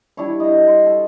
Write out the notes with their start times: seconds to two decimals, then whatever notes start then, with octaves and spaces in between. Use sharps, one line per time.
0.17 G3 D4 E4 C#5
0.40 D#5 E5
0.67 C6
0.86 A4